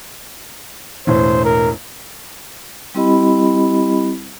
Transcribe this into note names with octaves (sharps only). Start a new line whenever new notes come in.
E1 A2 E3 C5
A#4
G3 C4 E4 G4 D#5 B5